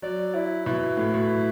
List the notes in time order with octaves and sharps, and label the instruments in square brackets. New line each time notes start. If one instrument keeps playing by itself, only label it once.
[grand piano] F#3 [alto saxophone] D5
[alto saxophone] E4
[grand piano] B2 [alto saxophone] E4
[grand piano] A2
B2